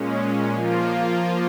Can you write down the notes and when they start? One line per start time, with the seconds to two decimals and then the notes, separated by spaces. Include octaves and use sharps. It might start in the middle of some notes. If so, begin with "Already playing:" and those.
Already playing: A#2 G#3 C#4
0.53 F3 A#3 F4